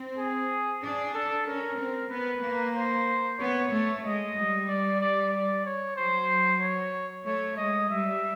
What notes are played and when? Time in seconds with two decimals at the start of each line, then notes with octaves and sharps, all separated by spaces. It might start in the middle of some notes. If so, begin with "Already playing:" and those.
Already playing: C4
0.18 G#4
0.82 D4 G#4
1.14 A4
1.47 C#4 A#4
1.78 C4
2.11 B3 B4
2.43 A#3
2.75 C5
3.39 B3 C#5
3.72 A3
4.03 G#3 D#5
4.36 G3
4.68 D5
5.01 D5
5.33 D5
5.65 C#5
5.96 F#3 C5
6.61 C#5
7.25 A3 C#5
7.57 G#3 D#5
7.90 G3 E5